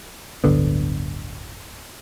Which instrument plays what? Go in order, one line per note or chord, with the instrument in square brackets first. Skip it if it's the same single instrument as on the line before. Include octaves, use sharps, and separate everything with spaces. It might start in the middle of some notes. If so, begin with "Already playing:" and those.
[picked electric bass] D1 G1 D3 B3